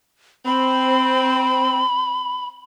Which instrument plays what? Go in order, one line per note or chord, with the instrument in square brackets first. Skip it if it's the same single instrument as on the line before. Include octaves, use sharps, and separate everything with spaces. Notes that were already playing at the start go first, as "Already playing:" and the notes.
[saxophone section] C4 [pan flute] B5